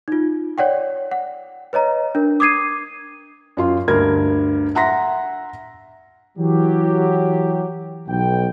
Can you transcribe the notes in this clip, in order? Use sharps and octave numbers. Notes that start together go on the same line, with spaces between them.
D#4 F4
C#5 D5 F#5 G5
F#5
B4 C#5 D#5 A#5
D4 A#4
D6 D#6 G#6 C7 D#7
F#2 F4 C6
D2 G2 A#4 C6 G#6
E5 F#5 A#5 C6 A#6 B6
E3 F#3 G4
B1 G5